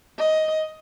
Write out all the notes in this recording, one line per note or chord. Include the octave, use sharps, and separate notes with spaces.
D#5